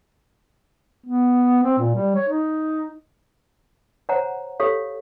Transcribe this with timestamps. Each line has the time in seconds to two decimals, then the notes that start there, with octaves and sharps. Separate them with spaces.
1.06 B3
1.63 C4
1.79 A#2
1.95 G3
2.15 C#5
2.29 D#4
4.09 C5 C#5 F#5 G#5 A#5
4.60 G4 A4 C#5 F5